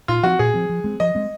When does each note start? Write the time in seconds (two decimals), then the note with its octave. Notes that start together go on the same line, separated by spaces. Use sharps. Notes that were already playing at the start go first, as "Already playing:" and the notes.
0.08 A#2 F4
0.23 F3 C4 F#4
0.39 A#2 G#4
0.54 F3 C4
0.70 F3
0.84 G#3 C4
1.00 F3 D#5
1.15 G#3 C4